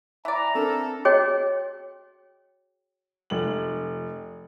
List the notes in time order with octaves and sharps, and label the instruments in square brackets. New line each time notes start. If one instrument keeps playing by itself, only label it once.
[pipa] E3 D5 [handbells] E5 [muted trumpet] A#5
[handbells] C4 D4 A#4 [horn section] A4
[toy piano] F#4 G#4 C#5 D#5 G5
[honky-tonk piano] F1 F#7